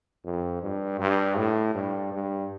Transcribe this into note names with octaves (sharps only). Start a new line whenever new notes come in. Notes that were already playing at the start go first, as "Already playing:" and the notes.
F2
G2
G2
A2
G2
G2